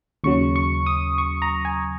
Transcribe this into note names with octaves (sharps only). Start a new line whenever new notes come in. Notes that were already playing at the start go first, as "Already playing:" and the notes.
D#2 C#3 F#3 C#6
C#6
D#6
C#6
A#5
G#5